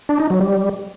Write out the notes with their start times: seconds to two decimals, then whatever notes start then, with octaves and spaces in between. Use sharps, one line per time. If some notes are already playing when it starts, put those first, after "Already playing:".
0.09 D4
0.20 D#4
0.30 F#3
0.41 G3